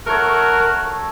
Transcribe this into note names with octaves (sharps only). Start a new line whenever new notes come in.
A3 F#4 A#4 C#5